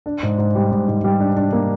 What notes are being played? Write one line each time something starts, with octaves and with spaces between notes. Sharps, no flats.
D4
G#2
G#2
G3
G#2
G#2
G3
D4
D4
A#3